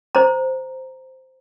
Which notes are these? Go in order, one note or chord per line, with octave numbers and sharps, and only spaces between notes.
C5 A#5